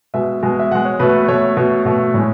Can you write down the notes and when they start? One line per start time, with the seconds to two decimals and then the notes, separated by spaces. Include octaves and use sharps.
0.14 B2 G#3 E5
0.43 B2 G#3
0.59 E5
0.71 B2 G#3 F#5
0.85 C#5
1.00 B2 A3 B4
1.28 B2 A3 C#5
1.57 B2 A3
1.86 B2 A3
2.14 A2 G#3